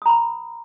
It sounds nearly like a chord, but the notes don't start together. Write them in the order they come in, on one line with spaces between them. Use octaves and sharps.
D#6 A#5 B5